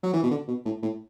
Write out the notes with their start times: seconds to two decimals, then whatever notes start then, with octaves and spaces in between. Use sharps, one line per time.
0.03 F#3
0.13 E3
0.23 B2
0.31 D3
0.48 B2
0.65 A2
0.82 A2